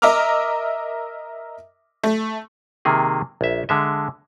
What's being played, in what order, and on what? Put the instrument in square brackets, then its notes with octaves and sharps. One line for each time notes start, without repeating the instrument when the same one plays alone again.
[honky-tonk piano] A#4 D#5 E5 A#5 D6 F6
A3
[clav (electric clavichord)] C3 D#3 A#3 G#4
A#1 E5
D3 G#3 E5